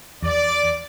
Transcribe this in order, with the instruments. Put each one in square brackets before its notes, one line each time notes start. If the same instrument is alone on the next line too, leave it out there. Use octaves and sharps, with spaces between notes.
[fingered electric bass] E2 [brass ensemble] D5